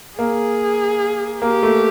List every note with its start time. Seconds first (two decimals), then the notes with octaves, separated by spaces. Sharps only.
0.19 A#3 G#4
1.42 A#3 G4
1.63 A3